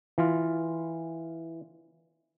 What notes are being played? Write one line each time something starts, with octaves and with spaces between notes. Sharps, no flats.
E3 F4